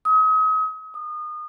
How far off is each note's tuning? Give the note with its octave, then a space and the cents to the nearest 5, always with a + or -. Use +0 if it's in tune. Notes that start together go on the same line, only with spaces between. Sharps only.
D#6 +40
D#6 -30